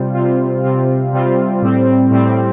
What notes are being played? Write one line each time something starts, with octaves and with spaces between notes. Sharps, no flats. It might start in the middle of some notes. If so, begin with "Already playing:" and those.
Already playing: C3 G3 C4 F4
C3 G3 C4 F4
C3 G3 C4 F4
C3 G3 C4 F4
A2 G3 C4
A2 G3 C4